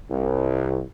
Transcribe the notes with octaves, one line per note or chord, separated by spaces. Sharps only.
C2